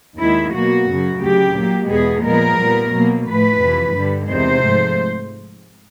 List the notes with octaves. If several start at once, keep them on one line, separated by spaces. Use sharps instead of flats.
D#2 D#3 G#3 E4
B2 F#3 A#3 F#4
F#2 C#3 F#3
D2 C#3 F#3 G4
A#2 F#3 A#3
E2 B2 G#3 B3 G#4
A#2 F3 G#3 B3 A#4
A#2 G3 B3
B2 F#3 A#3
A2 F3 A3 B4
F2 C3 E3
G2 D3 G3
E2 C3 D#3 G#3 C5
G#2 F3 A3